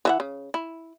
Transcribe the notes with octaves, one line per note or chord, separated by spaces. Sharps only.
E3 E5 F#5
C#3
E4